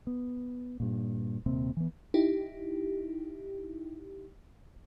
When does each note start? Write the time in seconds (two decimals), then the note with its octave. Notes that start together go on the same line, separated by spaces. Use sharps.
0.07 B3
0.80 G2 A#2
1.46 D#1 C3 A#3 C4
1.77 E3 B3
2.14 D#4 E4 G4